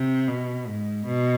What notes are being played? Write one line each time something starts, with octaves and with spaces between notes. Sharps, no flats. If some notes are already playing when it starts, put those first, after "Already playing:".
Already playing: C3
B2
G#2
B2